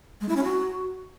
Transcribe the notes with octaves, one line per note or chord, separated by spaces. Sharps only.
G#3
E4
C#4
F#4